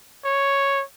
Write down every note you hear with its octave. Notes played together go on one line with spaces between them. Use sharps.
C#5